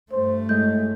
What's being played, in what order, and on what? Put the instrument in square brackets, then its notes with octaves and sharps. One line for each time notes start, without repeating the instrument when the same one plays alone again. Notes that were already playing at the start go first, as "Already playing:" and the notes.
[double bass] G2 A3 [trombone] C5
[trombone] A2 [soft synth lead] G#3 [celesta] G6